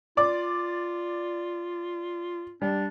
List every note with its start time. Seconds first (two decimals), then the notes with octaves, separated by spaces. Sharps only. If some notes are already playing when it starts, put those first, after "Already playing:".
0.17 F4 D5 D6
2.62 G3 D4